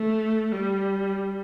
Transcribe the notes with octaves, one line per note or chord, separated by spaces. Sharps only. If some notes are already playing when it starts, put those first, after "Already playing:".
Already playing: A3
G3